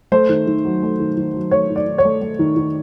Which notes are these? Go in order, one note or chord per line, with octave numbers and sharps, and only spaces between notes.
A3 C5
D#3
D#3
F#3
A3
D#3
D#3
F#3
A3 C#5
D#3
D5
D#3
C#5
A3
A3
D#3
D#3